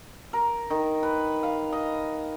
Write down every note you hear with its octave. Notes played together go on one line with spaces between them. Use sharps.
A#4
D#3
B4
F5
D#5